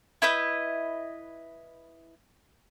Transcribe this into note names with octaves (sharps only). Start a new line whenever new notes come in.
E4 B4 D#5 G6